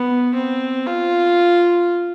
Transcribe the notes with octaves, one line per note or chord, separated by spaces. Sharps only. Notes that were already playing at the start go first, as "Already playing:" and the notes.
Already playing: B3
C4
F4